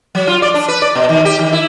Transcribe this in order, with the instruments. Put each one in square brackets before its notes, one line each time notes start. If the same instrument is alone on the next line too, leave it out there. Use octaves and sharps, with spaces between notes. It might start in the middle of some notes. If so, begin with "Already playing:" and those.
[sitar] F#3
F4
D5
D4
B4
D5
B2
D#3
G4
D#3
E4